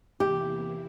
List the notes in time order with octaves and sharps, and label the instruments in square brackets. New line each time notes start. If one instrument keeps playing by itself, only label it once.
[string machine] E2 C3 E3 A#3 E4 [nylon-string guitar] G4